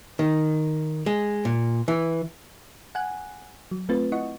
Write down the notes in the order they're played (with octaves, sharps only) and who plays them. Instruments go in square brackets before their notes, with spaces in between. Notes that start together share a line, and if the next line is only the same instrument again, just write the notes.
[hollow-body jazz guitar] D#3
G#3
A#2
E3
[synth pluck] F#5 G#5 F#6
F#3
A3 C4 F4 B4 A6
E4 D#5 F#5 C#6